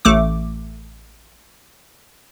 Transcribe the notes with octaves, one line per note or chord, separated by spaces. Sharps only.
A1 A3 D6